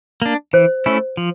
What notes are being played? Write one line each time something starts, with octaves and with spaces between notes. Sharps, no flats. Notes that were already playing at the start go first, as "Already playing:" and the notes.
A#3 D4
E3 C5
A3 C#4 E4
F3